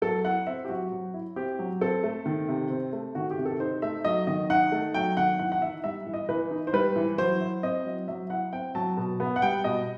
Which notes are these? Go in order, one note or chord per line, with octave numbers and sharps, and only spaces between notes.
F#3 A4
E4 F#5
C4 E5
G4
F#3 F#4
F#3
E4
C4 G4
F#3
C4 A4
A3
D#3
C3
C4
A3
D#3 F#4
G4
C3
A4
D#4 C5
A3 E5
F#3 D#5
D#3 D#5
D#4 F#5
A3
F#3 G5
D#3 F#5
E3 F#5
F#5
D#4 E5
G3 E5
E3
D#5
E3 B4
D#4
C5
G3 B4
E3
F#3 C5
E4
C4 D#5
F#3
F#3 E5
E4 F#5
C4 G5
F#3 A5
B2
B3
F#5
G3 G5
B2 D#5